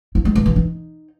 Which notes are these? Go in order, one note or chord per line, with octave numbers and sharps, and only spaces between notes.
E4
G#3
E3
E3
D#4